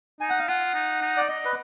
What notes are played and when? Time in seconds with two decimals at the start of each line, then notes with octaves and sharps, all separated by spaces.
0.21 D#4 G#5
0.30 F#5
0.39 F5
0.48 F4 F#5
0.74 D#4
1.01 D#4
1.17 D5
1.28 D#5
1.45 B4